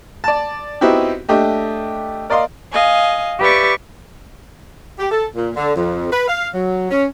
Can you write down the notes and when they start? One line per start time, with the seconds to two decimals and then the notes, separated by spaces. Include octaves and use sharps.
0.24 D5 A5
0.81 B3 C4 D#4 E4 F#4 G4
1.29 A3 D4 G4 D#5
2.30 A#4 D5 D#5 F5 C6
2.73 D#5 F5 G#5
3.40 G4 B4 D5 E5 C#6 A6
4.99 G4
5.10 A4
5.35 A#2
5.56 D3
5.76 F2
6.11 B4
6.27 F5
6.53 F#3
6.90 C#4